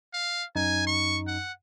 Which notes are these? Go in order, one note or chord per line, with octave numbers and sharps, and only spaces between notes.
F5
F#2 D#4 G#5
C#6
F#5